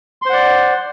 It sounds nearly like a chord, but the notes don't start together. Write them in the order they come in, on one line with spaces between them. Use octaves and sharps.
C6 C5 F#5 D5